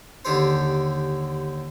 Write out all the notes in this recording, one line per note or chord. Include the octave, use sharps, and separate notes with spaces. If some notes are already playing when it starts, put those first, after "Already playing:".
D#2 D3 G4 A4 C5